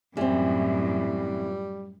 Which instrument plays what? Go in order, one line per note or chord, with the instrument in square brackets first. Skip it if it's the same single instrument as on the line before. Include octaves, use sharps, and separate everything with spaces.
[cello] F#2 A2 [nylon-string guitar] E3 C4 [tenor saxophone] G3